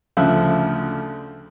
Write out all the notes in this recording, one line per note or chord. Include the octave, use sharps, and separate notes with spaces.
D2 C#3 F3 E5 F#6